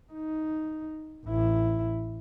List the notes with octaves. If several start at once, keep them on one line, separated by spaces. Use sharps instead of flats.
D#4
A1 E4